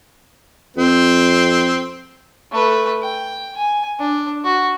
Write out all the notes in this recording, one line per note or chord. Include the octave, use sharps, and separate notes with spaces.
F2 C4
A3 B4
G5
G#5
D4
F#4